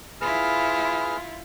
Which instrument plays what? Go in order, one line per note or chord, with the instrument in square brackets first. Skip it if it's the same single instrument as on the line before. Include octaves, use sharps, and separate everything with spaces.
[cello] E4 F4 [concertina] G#4 B4 F6